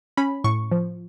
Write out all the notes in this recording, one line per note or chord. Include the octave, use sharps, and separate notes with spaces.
C#4 B5
A2 C#6
F3